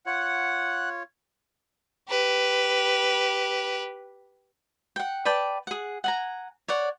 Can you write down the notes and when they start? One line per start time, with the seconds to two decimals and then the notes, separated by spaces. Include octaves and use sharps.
0.06 F4 C#5 F#5
2.09 G4 B4
4.96 F#5 G5
5.25 B4 D5 G5 A5
5.67 G#4 F#5
6.04 F#5 G#5 A#5
6.68 C#5 D5 F#5